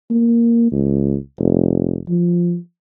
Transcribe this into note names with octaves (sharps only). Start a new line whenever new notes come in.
A#3
C#2
F1
F3